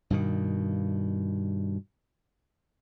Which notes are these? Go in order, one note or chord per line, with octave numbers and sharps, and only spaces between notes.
G2 B2 D#3